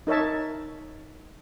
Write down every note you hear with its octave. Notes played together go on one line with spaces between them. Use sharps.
D#4 A#4 C#5 E5 A5